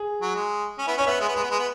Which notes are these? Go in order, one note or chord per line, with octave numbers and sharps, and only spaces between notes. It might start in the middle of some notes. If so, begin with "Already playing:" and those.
Already playing: G#4
F#3
G#3
C#4
B3 E4
C#4 C#5
B3 E5
G#3
B3
G#3 B4
B3
G#3
B3